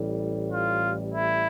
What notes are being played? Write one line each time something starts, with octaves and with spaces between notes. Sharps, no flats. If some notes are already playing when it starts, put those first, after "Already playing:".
Already playing: A1 A2 G3
F4
E4